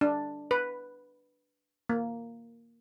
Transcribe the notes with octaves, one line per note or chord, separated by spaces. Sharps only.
D4
B4
A#3